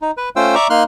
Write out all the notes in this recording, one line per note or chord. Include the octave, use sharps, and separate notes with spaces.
D#4
B4
A3 C#4 F4 C5 G5 E6
D5 E5 A#5 C#6 D6
A#3 D#4 C6 F6 F#6